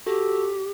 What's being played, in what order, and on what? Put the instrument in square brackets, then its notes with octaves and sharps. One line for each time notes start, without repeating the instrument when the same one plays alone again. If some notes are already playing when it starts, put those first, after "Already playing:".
[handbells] F#4 A4 [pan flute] G4